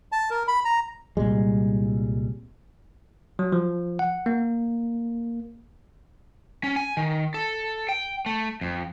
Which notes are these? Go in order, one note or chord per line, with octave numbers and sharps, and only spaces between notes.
A5
A#4
B5
A#5
C2 A#2 G3 G#3
F#3
F3
F#5
A#3
C#4
G#5
D#3
A4
G5
A3
F2